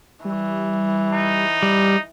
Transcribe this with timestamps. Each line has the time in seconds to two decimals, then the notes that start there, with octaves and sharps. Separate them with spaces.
0.25 E3 G3
1.13 D#4
1.63 G3